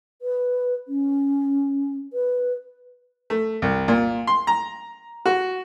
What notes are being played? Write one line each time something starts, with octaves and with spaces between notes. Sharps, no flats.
B4
C#4
B4
A3
C2
A#2
C6
A#5
F#4